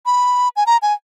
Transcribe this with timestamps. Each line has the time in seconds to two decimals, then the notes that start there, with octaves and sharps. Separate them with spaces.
0.06 B5
0.56 G#5
0.66 A#5
0.82 G#5